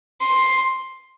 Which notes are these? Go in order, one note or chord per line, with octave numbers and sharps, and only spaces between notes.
C6